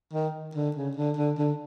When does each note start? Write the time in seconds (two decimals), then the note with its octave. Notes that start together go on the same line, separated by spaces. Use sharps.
0.13 D#3
0.55 D3
0.76 C#3
0.97 D3
1.17 D3
1.38 D3